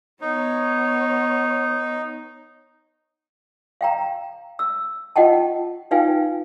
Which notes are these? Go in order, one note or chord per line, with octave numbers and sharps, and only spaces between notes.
B3 D#4 C#5
F5 G5 A#5
E6
F4 D#5 F#5 G5 A5
D#4 F4 B4 F5 G5 G#5